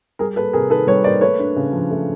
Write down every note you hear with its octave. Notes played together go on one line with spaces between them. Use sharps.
G3 G#4 A#4
A#3 A4 B4
C3 G#4 A#4
D#3 A4 B4
G3 B4 C#5
A#3 C5 D5
A3 B4 C#5
D4
C#3
F3
A3